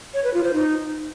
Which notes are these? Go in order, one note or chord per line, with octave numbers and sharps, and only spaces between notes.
C#5
B4
F4
C5
D#4